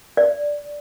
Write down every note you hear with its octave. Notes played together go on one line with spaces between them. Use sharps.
D5